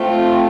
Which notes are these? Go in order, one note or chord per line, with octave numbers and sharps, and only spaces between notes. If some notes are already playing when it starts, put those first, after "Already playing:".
Already playing: A3 C4 F4